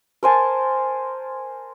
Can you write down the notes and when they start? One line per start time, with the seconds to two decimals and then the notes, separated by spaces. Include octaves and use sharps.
0.23 A#4 C5 G#5 A5